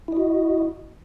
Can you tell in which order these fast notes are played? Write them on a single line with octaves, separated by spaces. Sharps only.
E4 D#5 F#4